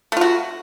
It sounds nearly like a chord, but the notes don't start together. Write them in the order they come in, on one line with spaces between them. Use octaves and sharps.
A3 F4 F#4